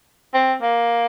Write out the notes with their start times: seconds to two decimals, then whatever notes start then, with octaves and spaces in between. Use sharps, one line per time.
0.34 C4
0.62 A#3